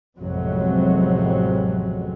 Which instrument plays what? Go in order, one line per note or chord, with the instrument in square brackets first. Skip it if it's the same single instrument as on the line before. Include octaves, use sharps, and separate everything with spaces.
[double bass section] A1 F2 C3 F#3 G#3